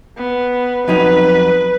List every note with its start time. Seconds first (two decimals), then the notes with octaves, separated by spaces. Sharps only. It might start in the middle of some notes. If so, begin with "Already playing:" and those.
0.17 B3
0.88 F2 F#3 D#4 B4